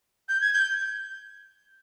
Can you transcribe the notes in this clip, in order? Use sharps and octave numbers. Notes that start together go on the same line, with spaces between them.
G6
G#6
G6